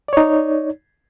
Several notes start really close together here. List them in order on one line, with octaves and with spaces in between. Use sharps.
D5 C#5 D#4